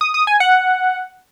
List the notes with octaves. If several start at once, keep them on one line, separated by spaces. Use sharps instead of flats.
D#6
D#6
G#5
F#5